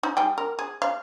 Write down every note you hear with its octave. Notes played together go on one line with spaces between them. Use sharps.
D#4
G3 G#4 G5
A#4
G#4
F5